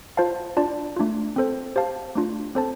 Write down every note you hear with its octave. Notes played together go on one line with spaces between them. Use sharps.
F4 C5 F5 A5
D4 F4 D5 A5
A3 D4 F4
C4 A4 C5
G4 C5 F5 A5
A3 D4 F4
C4 A4 C5 A5